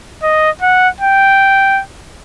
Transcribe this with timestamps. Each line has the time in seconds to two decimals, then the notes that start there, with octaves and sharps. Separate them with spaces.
0.23 D#5
0.61 F#5
1.00 G5